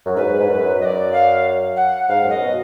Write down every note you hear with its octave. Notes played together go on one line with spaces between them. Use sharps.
F#2
G#2 B4
G#2
F#2
F#2 D#5
D5
F5
F#5
G#2 F5
F#2
D#5
B2